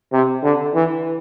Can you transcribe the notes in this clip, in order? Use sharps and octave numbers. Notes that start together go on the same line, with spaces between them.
C3
D3
E3